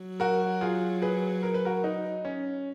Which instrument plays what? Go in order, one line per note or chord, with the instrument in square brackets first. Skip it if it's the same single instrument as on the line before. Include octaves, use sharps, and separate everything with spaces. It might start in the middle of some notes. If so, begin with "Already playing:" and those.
Already playing: [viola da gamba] F#3
[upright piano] F#4 A#4
F4 G#4
G#4 B4
A#4
B4
F#4 A#4
D#4
C#4